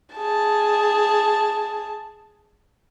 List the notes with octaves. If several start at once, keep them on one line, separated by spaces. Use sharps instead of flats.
G#4 A5